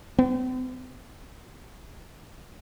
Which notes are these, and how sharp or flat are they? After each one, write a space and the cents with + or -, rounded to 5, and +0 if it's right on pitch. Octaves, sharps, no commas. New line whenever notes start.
C4 -45